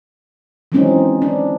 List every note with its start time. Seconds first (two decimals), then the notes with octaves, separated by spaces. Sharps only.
0.72 E3 F#3 G#3 C4 C#4 D#4
1.22 D4